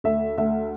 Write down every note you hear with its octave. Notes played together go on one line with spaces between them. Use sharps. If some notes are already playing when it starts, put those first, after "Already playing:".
D2 E5
D2 E5